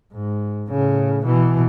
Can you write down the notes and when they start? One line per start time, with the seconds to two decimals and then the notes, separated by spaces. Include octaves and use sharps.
0.13 G#2
0.70 A2 C#3
1.24 B2 E3